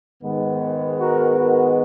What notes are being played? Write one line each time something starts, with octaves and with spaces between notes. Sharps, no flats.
G#2 D#3 G#3 B3
F#4 A#4
F#4 A#4